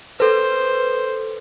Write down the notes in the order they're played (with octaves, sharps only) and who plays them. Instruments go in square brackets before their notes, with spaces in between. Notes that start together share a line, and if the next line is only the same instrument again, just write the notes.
[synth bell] A4 B4 [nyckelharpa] C5